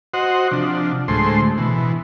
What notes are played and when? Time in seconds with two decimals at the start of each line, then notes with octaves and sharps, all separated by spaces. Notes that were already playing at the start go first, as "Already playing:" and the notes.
0.14 F#4 C5 D#5 F#5
0.51 C3 F3 D4
1.08 D2 A2 G#3 A3 C5 C6
1.58 B2 E3